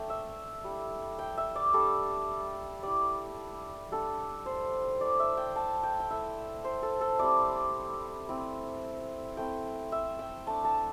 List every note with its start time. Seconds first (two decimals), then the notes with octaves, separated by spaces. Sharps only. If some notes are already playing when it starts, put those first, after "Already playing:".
Already playing: A3 D4 G5
0.10 E5
0.64 G3 E4
1.19 G5
1.37 E5
1.55 D5
1.73 G3 D4 A4
2.83 G3 E4 D5
3.92 G3 D4 A4
4.46 C5
5.01 A3 E4 D5
5.20 E5
5.37 G5
5.56 A5
5.83 G5
6.00 G5
6.10 A3 E4 E5
6.64 C5
6.82 A4
7.01 A4
7.19 G3 C4 E4 D5
8.28 A3 C4 E4
9.37 A3 C4 E4 G5
9.92 E5
10.19 G5
10.47 A3 D4 A5
10.64 A5